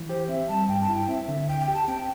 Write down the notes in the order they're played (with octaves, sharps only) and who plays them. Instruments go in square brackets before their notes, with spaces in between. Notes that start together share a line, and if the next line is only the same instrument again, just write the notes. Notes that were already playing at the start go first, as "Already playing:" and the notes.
Already playing: [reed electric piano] E3
[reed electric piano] G4 [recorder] C5
[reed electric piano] C4 [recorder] E5
[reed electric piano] G3 [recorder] A5
[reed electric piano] G2 [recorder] G5
[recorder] A5
[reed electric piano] E4
[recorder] G5
[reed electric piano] C4 [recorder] E5
[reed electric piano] D3
[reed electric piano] D2 [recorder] G5
[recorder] G5
[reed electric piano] G4
[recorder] A5
[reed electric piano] C4 [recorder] G5